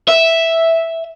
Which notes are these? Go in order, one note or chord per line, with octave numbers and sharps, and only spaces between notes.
E5